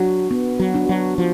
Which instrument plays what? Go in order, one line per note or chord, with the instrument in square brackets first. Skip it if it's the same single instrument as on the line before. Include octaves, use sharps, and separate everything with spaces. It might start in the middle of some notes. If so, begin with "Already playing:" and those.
Already playing: [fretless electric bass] F#3 [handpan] D4 F#4
[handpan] B3
[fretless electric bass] F#3
[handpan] D4 F#4
[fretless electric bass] F#3
F3